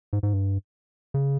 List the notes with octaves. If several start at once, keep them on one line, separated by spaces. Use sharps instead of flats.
G#2
G#2
G2
C#3